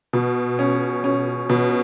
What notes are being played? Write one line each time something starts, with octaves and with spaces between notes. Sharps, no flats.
B2
C#4
C#4
B2